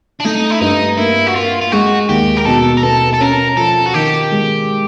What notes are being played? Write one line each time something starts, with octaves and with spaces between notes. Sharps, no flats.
D4
A3 D#4
E4
G2 D#4
A#3 E4
F#4
A#3 F4
F4
G#3 F#4
D#2 G4
A#4
B2 A4
A#4
B3 A4
A4
C#4 A#4
F3 A4
F#4
D#3 G4
G#3